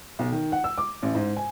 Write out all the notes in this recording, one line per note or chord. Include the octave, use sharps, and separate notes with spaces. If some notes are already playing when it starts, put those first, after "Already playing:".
B1
D#3
F#5
E6
D6
A1
G#2
G#5